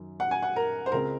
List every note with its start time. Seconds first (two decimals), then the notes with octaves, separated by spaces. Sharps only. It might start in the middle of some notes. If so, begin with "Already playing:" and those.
Already playing: F#2 D#3 F#3
0.20 F#5
0.31 G#5
0.43 F#5
0.56 A#4
0.86 C5
0.92 C#2 C#3 G#3 C4 A#4